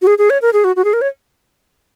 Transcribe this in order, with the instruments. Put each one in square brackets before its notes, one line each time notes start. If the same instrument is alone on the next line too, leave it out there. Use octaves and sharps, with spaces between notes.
[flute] F#4
G#4
G#4
C#5
A#4
G#4
F#4
F#4
G#4
A#4
C#5